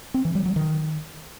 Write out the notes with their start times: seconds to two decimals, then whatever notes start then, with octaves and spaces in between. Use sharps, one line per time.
0.14 C4
0.25 E3
0.35 G3
0.46 F#3
0.56 D#3